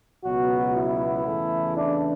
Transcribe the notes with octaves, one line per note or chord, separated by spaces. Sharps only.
C#2 B2 F#3 B3 F#4
E4
E2 C#3 E3 A3
D4